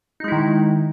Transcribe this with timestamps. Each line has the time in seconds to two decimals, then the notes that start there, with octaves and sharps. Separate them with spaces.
0.20 D#4
0.24 G#3
0.28 E4
0.32 D#3